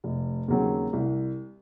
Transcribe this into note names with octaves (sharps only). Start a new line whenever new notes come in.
F1
D#2 C#3 F#3 C4
C2